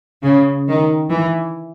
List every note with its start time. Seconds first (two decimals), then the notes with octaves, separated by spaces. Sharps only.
0.23 C#3
0.67 D#3
1.10 E3